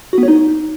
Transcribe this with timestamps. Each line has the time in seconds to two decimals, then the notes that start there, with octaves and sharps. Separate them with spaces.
0.13 F#4
0.18 B3
0.23 C#5
0.28 D#4